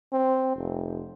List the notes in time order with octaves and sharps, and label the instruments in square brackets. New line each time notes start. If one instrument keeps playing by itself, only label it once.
[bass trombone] C4
F1